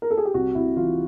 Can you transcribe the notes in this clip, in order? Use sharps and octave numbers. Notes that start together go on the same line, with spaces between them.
A#4
A4
G#4
G4
C2 F#4
C2 E4
E3 F4